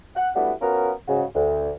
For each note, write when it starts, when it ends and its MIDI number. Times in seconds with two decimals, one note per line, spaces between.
0.16 0.30 78
0.36 0.53 55
0.36 0.53 57
0.36 0.53 59
0.36 0.53 62
0.36 0.53 64
0.36 0.53 66
0.61 0.92 59
0.61 0.92 61
0.61 0.92 65
0.61 0.92 66
0.61 0.92 70
1.08 1.25 44
1.08 1.25 49
1.08 1.25 66
1.35 1.71 38